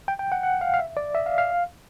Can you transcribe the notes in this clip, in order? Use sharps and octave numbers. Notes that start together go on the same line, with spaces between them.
G5
G5
F#5
F#5
F5
F5
E5
D5
E5
F5
F5